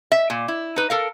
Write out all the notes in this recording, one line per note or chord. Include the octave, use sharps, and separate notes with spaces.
E5
A#2
E4
D#4 B4
A4 A#4 F5